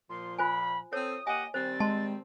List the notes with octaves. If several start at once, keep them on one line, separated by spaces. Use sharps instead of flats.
A#2 F3 C6
F4 C5 G#5 B5
C4 A4 C#5 D#6
A#3 G4 D#5 F#5 G#5
D#3 G3 C4 C5 A6
G#3 A5 C6